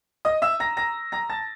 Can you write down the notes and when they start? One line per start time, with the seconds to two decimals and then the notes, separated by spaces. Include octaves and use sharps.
0.25 D#5 D#6
0.42 E5 E6
0.60 A#5 A#6
0.77 A#5 A#6
1.12 A#5 A#6
1.29 A5 A6